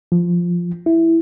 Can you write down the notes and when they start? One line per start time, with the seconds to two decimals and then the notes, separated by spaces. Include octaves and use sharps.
0.12 F3
0.86 E4